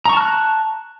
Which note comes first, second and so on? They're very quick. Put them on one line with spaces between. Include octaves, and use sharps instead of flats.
A#5 C#6 A5 F6 F#6